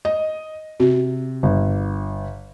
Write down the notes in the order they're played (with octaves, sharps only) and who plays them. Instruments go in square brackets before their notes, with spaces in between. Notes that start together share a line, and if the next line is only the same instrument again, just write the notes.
[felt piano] D#5
[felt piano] C3 [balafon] F#4
[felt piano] G1